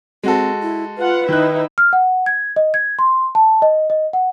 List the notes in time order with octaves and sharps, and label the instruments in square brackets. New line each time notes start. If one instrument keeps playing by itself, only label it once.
[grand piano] G#3 F#4 A4 [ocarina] C4
[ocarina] E4
[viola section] F4 F#5 [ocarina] B4
[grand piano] D#3 F#6 [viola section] D#4 E4 E5
[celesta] F6
F#5
G#6
D#5
G#6
C6
A5
D#5
D#5
F#5